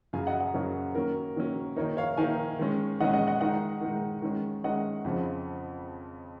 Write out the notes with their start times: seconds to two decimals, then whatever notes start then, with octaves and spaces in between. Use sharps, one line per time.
0.13 F#2 C#3 F#3 F5 G#5
0.27 D#5 F#5
0.40 D#5 F#5
0.54 F#2 C#3 F#3 A#4 C#5
0.95 D#3 F#3 A#3 C#4 A#4
1.36 D#3 F#3 A#3 C#4
1.76 D#3 A#3 D#4 A#4 C#5
1.97 C#5 F5
2.17 D#3 A#3 D#4 F5 G#5
2.59 D#3 G#3 C#4
3.00 D#3 G#3 C#4 D#5 F#5
3.13 D#5 F#5
3.27 D#5 F#5
3.40 D#3 G#3 D#4 D#5 F#5
3.81 D#3 G#3 D#4
4.22 D#3 G#3 C#4
4.64 D#3 G#3 C#4 D#5 F#5
5.05 F2 C#3 F3